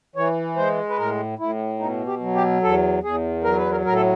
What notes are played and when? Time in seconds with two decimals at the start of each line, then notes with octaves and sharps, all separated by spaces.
0.16 E3 C#5
0.56 G#3 C5
0.89 B4
0.98 A2 A#4
1.39 A2 E4
1.79 B2 D#4
2.07 G4
2.20 F#3
2.35 G4
2.62 E2 A4
3.03 E2 G#4
3.43 F#3 A#4
3.57 B4
3.71 A#4
3.85 A2 A#4
3.93 A4